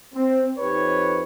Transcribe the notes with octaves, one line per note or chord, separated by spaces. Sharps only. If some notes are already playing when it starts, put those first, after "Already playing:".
C4
F2 C4 D#4 G4 B4 C#5